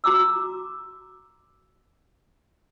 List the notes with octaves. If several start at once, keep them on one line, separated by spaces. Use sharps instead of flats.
F#4 A#5 D6 E6